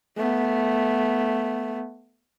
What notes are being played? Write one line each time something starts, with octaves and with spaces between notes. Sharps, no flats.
A3 B3